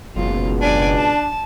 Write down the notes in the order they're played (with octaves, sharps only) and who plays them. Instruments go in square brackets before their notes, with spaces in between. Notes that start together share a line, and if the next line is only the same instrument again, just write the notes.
[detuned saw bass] F#1 [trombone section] C#2 B2 [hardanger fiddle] F4
[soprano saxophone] D4 [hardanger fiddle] D5 G#5
[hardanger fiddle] A5